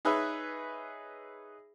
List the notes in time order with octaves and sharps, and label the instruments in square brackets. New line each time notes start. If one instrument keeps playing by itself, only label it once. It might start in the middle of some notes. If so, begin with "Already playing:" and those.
[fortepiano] D#4 G#4 B4 C#5 E5 B5